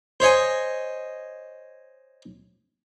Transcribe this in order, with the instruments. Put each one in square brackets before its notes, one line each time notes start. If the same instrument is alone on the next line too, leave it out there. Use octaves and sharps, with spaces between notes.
[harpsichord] C5 C#5 D#5 G#5